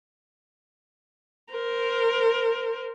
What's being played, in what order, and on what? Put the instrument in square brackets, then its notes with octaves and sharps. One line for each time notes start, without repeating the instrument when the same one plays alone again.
[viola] A#4 C5